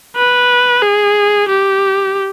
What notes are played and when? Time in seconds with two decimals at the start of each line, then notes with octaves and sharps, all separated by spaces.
0.16 B4
0.82 G#4
1.48 G4